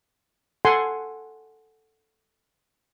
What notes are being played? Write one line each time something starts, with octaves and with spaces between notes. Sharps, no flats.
A4 F#5 G#5 C6